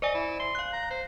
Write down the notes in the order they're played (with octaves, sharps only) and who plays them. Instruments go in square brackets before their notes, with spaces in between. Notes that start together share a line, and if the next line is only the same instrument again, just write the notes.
[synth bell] C5 D5 G#5 [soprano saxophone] D#5
[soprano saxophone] E4
C6
[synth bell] F5 F#6
[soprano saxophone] A#5
C5